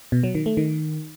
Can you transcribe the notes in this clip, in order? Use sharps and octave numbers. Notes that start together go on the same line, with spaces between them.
B2
F#3
D#3
A3
D#3